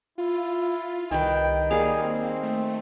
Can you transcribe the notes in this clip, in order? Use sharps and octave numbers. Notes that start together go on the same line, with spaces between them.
E4 F4
C2 D#3 B4 G5
G3 A#3 G#4 F5
C4
A3